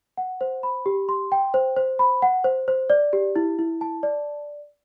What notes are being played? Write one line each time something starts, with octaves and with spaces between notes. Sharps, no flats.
F#5
C5
B5
G4
C6
G5
C5
C5
B5
F#5
C5
C5
D5
G4
E4
E4
A5
D5